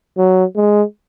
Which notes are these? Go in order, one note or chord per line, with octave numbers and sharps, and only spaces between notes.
F#3
G#3